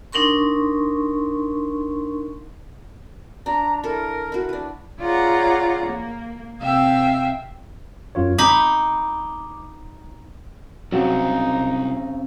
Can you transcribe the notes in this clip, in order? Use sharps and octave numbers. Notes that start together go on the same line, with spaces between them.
D4 D#4 A#4 C6 C#6
D4 A#5
E4 A4 A#4
E4 F#4
D4 B4
F4 G#4 C#5 D5 F#5 A#5
A#3
C3 E5 F5 G5
F#2 F4 C#5
D#4 B5 D6
C2 C#3 F#3 C4 D#4